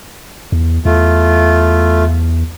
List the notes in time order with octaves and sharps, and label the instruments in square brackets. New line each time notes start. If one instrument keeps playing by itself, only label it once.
[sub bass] E2
[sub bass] E2 [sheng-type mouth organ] A3 F4